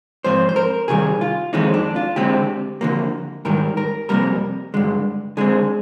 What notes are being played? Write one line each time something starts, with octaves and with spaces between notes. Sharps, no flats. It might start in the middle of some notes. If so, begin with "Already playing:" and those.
G#2 F3 C4 C5
C5
A#4
C3 D#3 G3 G#4
F4
F2 D#3 G#3 C4 D#4
D4
F4
D3 G#3 C4 G4
D3 F3 A#3
G#2 D#3 G3 A#4
A#4
F2 C3 G3 A#3 A#4
G2 D3 G#3
D3 G#3 C4 G#4